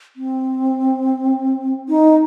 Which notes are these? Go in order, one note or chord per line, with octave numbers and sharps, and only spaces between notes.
C4
D#4